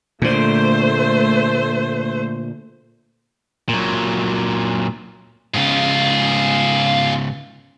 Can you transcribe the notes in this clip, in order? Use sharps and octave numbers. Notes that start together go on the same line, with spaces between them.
A#2 D3 A3 C5
A#2 F#3
G#2 C#3 F4 G#4